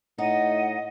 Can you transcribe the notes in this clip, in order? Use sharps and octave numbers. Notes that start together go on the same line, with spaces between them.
A2 D#4 D#5 F#5